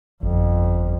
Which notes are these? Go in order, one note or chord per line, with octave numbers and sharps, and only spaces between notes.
G1 F2